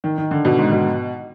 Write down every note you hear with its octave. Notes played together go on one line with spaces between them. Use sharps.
D#3
D#3
D3
B2
G#2
B2